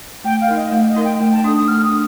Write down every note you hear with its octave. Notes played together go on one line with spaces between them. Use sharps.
A3 G5
F5
D#4 A#4
D#5
A3 F5
D#5
D#4 A#4
G5
A3 G5
A5
D4 A4 D#6
D#6
A3 F6
D#6
D4